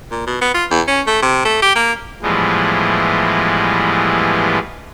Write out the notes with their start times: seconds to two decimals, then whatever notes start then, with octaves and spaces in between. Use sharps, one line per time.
0.11 A#2
0.27 B2
0.41 B3
0.54 F4
0.71 E2
0.88 C#4
1.07 A3
1.22 C3
1.45 A3
1.62 G4
1.75 A#3
2.22 A2 E3 F3 G3 G#3 B3